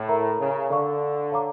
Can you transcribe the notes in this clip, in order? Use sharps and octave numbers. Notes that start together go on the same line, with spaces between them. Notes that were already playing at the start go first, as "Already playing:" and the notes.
Already playing: A2
A#4 E5 A#5
C#3
D3 A4 D5 F5 C#6
C#5 F5 A#5 D6